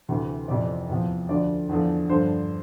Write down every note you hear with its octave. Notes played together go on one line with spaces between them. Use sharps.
D2 C3 E3
F2 C3 E3 D5
E2 C3 F3
D2 D3 F3 D5
E2 D3 F3
G2 D3 F3 C5